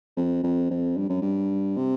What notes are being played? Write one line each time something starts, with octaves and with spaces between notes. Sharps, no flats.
F2
F2
F2
G2
F#2
G2
C3